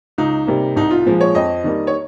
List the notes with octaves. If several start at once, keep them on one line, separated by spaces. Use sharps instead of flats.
C#2 D#4
C3 G3 A#3
C2 D#4
F4
A#2 F3 G#3
C#5
F2 D#5
D#3 G3 A#3
C#5